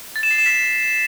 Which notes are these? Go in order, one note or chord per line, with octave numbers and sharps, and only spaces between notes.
A6
E7
C7
E7
B6